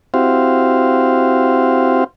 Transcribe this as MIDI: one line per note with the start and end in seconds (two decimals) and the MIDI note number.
0.14 2.04 60
0.14 2.04 64
0.14 2.04 66
0.14 2.04 67
0.14 2.04 72
0.14 2.04 77